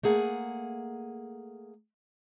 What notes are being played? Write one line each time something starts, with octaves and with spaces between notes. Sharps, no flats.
A3 A#3 G#4 F#5